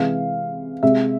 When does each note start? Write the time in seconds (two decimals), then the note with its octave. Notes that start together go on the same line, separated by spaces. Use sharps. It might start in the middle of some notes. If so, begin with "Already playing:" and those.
Already playing: C3 E3 G#3 F5
0.83 C3 G#3 E5